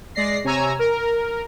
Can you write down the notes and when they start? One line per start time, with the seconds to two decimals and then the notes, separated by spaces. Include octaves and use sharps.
0.15 G#3 D5 A#6 C7
0.44 C3 C#5 G#5 A#5 E6
0.79 A#4